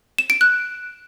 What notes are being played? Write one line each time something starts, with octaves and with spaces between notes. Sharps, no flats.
E7
D7
F#6